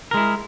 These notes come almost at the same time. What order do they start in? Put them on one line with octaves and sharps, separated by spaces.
A#4 G#3 E4